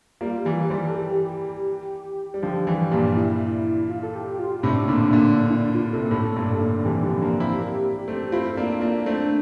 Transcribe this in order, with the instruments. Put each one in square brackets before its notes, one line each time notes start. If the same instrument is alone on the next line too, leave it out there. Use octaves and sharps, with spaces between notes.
[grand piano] G3 A#3 [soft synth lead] F4
[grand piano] E3 G3
[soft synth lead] D5
[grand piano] E3 G3 [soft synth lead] C5
[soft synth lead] A#4
A4
G4
[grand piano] G3
[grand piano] D3 F3 [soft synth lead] G4
[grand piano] E3 G3
G2 A#2
[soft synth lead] E4
F4
A4
G4
F4
[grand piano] A2 C3 [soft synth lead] D4
[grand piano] A#2 D3
A#2 D3
[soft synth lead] D4
E4
D4
F4
[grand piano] C3 [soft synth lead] A4
[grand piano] A#2
[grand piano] A2 [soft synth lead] A4
[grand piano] G2 A#2
A#2 D3
[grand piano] C3 E3 [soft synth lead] G4
[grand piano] D3 F3
A#3 D4
C4 E4
A#3 D4
A3 C4
[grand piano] C4 E4 [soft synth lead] F4
[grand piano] A#3 D4
A#3 D4
[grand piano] A3 C4 [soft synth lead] D4